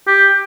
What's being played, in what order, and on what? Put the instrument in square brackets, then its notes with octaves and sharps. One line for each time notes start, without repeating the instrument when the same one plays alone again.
[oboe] G4